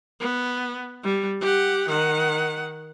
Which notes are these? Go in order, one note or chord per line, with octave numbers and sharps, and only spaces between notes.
B3
G3
G4 F#5
D#3 F#5